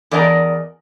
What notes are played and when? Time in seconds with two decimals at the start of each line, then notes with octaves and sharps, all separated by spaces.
0.11 E2 A#4 D5 D#5 A5 A#5